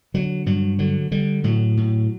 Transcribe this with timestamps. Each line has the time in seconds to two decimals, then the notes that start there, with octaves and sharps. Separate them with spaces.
0.14 D3 F#3
0.46 G2 F#3
0.79 D3 F#3
1.11 D3 G3
1.44 A2 F#3
1.77 A2